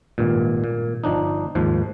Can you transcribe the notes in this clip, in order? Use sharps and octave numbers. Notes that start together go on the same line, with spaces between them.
G#1 G2 A#2
A#2
G1 F3 D4 D#4
D#2 G#2 F3